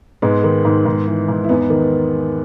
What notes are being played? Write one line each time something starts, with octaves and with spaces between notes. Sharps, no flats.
G#2 G#3 B3
D#3
G#2
G#2
E3
G#2
E4
E2 B3 D#4
D#3